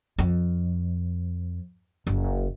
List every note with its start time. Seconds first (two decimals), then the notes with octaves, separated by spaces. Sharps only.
0.18 F2
2.07 F#1